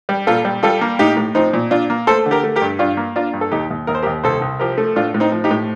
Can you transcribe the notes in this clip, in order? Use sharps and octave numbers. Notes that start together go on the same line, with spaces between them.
G3
A#2 F4 A4
G3
G3 F4 A4
A#3
A2 D#4 G4
A2
F3 C4 D#4
A#2
A#2 D4 F4
A#3
A3 A4 C5
D3
G4 A#4
A3
G4 A#4
G2
G2 D4 F4
A#3
A#3 D4 F4
G2
A4
D#2 D#4 G4
D#2
D#2 A#4
C5
G4 A#4
D#2
C2 A4 C5
C2
F3 G4 A#4
A3
A2 D4 F4
A2
C4 D#4
F3
D#4 G4
A2